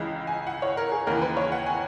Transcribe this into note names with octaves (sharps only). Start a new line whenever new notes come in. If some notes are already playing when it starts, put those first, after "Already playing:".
Already playing: C#2 C#3 E3 D#5
G#5
F#5
C#5
A#4
G#4
D#2 C#3 E3 A#4
B4
C#5
F#5
G#5